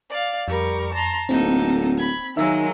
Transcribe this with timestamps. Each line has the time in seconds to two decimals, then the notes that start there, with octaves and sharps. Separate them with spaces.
0.11 D5 F5
0.48 F2 G3 A#4 C#6
0.93 A5 A#5 C6
1.29 D1 A#3 C4 D#4 A4
1.98 B5 G#6
2.37 D#3 F#3 G#3 A#3 E5 E6